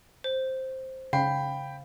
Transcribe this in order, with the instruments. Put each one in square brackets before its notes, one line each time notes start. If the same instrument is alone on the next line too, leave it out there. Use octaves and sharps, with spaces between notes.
[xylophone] C5
[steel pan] C#3 [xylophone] F5 [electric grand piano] G5 B5